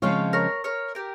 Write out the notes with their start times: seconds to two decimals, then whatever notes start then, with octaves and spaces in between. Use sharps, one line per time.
0.02 C#3 F3 G#3 C4 F4 C#5 F5
0.33 A#4 C#5
0.64 A#4 C#5
0.95 G4 A#4